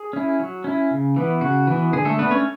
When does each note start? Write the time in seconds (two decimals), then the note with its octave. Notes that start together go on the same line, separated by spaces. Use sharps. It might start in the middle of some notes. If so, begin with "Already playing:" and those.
Already playing: G#4
0.13 C#4 E4
0.40 F#3
0.64 C#4 E4
0.91 C#3
1.16 E3 B3
1.41 C#3 F#4
1.67 E3 B3
1.93 D3 G#4
2.05 A3 A4
2.18 A3 B3 D4 B4
2.31 C#4 C#5